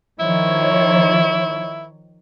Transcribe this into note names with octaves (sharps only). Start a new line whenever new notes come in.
D#3 F3 E4 C#5